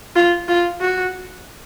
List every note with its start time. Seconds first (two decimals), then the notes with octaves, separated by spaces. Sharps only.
0.15 F4
0.48 F4
0.81 F#4